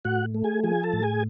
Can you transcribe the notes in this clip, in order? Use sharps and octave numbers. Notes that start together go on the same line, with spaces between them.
A2 F#4 F#5
A3
G#4 G#5
F3 G#4 G#5
A4 A5
A2
G#4 G#5